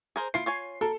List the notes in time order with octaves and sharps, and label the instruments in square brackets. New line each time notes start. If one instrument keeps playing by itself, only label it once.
[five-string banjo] G#4 A#4 C5
[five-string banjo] E4 F4 [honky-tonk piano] C7
[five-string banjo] F4 C#5 G#5
[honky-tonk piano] A4 [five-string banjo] A#4